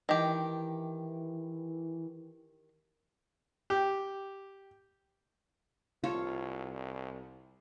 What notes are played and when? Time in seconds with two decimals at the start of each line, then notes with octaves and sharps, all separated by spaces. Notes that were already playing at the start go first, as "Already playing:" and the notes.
0.09 D#3 E3 G4
3.70 G4
6.04 C2 F4 A4 C#5